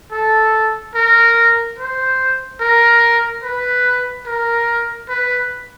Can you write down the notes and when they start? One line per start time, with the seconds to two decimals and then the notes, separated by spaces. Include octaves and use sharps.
0.12 A4
0.95 A#4
1.78 C5
2.60 A#4
3.43 B4
4.26 A#4
5.09 B4